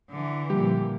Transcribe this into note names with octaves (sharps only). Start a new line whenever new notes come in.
D3 E3
A#2 F3 G3 A#3 G4